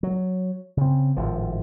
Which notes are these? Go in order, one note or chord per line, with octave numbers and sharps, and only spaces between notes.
F#3
C#3 C4
G#1 A2 F3